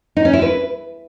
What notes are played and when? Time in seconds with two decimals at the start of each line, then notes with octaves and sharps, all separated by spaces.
0.17 D#4
0.25 C#4
0.33 E4
0.42 B4